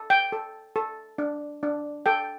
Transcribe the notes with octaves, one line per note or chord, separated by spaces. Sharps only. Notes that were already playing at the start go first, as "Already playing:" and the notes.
Already playing: A4
G5
A4
A4
D4
D4
A4 G5